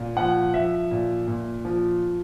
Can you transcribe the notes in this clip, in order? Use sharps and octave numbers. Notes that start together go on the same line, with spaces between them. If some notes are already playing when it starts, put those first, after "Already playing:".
Already playing: A#2
F3 F#5
F3 E5
A#2
A#2
F3